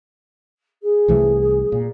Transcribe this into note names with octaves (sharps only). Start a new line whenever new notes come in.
G#4
C2 E3 A3
A#2